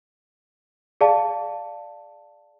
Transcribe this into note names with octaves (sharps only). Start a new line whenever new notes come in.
G#4 D5 F5 A5